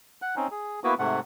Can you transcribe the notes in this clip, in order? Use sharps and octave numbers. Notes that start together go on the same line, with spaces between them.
F#5 F#6
C4 C#4 D#4
G#4
A#3 B3 E4 F#4 B4
G#2 C3 A3 F#5